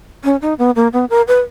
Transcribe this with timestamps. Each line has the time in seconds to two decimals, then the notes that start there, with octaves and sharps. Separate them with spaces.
0.24 C#4
0.42 D#4
0.59 B3
0.76 A#3
0.93 B3
1.10 A#4
1.27 B4